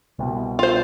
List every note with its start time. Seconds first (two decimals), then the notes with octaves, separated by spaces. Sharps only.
0.19 C2 B2
0.59 F4 C5